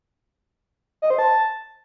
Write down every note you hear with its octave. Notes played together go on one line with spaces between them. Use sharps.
D#5
C5
A5